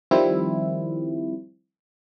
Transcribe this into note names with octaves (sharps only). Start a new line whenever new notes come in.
D#3 F3 G3 C4 E4